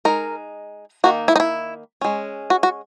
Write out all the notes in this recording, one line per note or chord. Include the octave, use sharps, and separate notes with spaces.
G#3 D#4 A#4
D#3 A#3 D#4 F#4
E4
D#4
E4
G#3 C#4
F#4
F#4